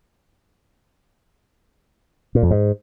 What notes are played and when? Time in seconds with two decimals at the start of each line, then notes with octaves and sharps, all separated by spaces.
2.35 A#2
2.43 F2
2.51 G#2